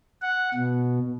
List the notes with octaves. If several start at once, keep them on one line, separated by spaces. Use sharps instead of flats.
F#5
B2